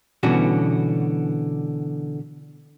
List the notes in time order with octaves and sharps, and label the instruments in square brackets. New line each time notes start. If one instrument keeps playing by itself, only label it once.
[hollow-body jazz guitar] B2 D3 E3 G3 C#4 F#4